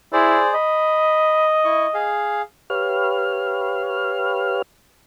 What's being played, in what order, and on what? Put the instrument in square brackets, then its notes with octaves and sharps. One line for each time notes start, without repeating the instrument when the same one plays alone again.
[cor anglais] E4 [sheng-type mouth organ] G#4 C5 D5
[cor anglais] D#5 [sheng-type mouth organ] B5
[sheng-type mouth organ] E4 C#6
G#4 F5
[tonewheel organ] G4 B4 C#5 F5 F6